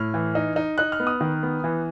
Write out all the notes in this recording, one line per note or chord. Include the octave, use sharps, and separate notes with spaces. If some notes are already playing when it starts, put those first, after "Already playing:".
Already playing: A2 F6
E3
D#4
D#4
D#4 F#6
F6
B3
D#6
D#3
B3
E3